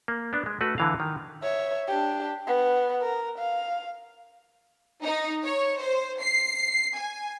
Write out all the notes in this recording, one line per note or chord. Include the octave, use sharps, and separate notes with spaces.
A#3
B3 D4
G#3
A3 F#4 B4
D3 E3 F5
D#3
C#5 E5
D4 G4
B3
A#4
F5
D#4
C#5
C5
C7
G#5